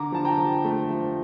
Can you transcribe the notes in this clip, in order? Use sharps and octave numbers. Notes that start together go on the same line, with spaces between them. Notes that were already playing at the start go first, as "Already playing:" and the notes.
Already playing: D3 A#5 D6
F3 A5
G5 A#5
F3
A3
F3